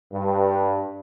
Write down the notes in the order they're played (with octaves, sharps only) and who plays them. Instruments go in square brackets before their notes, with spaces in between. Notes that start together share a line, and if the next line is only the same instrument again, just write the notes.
[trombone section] G2